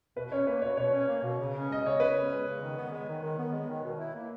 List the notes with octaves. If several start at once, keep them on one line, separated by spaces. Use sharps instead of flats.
B2 B4
C#4 C#5
A#3 B4
B2 C#5
B2 C#5
C#4
A#3
B2
C#3
C#4
G#3 D#5
C#3 C#5
C#3 B4
C#4
G#3
C#3
D#3
B3
G#3
D#3
D#3
B3
G#3
D#3
B2
E4
A#3